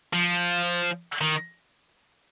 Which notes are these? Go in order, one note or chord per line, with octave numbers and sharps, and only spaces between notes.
F3
D#3